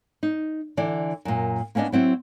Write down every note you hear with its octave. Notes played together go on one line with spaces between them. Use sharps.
D#4
D3 E3 D5
F#2 A#2
A#3 B3 C#4 D4 D#5
F#3 C4 E4 F#5